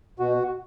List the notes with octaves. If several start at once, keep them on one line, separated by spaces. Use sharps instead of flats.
B2 F#4